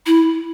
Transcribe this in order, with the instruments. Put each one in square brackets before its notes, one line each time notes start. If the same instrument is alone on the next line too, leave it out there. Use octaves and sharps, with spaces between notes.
[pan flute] E4